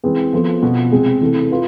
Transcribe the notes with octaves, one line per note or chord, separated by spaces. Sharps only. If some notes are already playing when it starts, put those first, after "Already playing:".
E3 G#3 C4 G#4 B4
F3 B3 F4 A4 C5
B2 B3 F4
C3 G#3 C4 G#4
C3 E3 A3
F4 B4